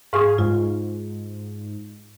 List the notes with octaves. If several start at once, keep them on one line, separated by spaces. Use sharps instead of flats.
G#2 G#4 F5 C#6
G#2 F4